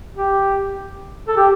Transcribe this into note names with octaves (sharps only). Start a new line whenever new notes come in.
G4
A4
G4